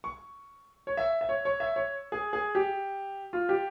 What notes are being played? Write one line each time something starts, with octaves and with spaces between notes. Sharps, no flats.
C#6
C#5
E5
E5
C#5
C#5
E5
C#5
G#4
G#4
G4
F4
G4